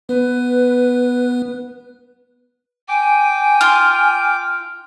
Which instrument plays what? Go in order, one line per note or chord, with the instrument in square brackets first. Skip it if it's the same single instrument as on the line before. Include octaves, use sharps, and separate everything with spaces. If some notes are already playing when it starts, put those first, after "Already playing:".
[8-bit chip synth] B3 [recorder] B4
[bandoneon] G5 D6 [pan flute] G#5
[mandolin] F4 [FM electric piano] F6